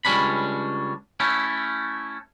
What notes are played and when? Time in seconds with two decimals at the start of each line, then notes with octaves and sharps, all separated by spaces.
0.05 C#2 F#2 G3 C#4 D4 B5
1.20 A3 C#4 E4